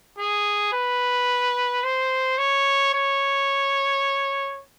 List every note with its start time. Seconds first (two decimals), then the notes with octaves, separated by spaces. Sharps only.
0.18 G#4
0.73 B4
1.83 C5
2.38 C#5
2.93 C#5